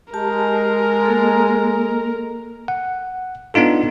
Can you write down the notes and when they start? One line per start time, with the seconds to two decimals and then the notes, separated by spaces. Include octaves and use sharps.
0.13 G#3 G4 A#4 A5
1.05 A#3 A4
2.68 F#5
3.54 B3 D4 D#4 F4 A4